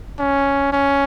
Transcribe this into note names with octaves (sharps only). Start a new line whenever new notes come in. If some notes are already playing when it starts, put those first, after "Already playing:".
C#4
C#4